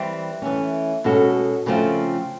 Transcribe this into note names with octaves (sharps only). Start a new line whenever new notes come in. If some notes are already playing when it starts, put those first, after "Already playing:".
Already playing: E3 G3 C4
E3 A3 C#4
B2 G#3 C#4 F#4 A4
C#3 F3 A3 C4 F4